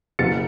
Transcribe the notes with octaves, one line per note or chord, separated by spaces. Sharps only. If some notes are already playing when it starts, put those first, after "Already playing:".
F#1 A6 C#7